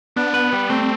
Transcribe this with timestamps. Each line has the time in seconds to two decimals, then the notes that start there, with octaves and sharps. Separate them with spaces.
0.16 B3 D4
0.34 B4
0.53 G3
0.70 A3 C4